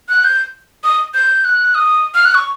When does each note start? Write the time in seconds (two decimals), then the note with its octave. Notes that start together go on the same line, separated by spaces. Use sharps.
0.09 F#6
0.24 G6
0.84 D#6
1.14 G6
1.45 F#6
1.75 D#6
2.15 F6
2.25 F#6
2.35 C#6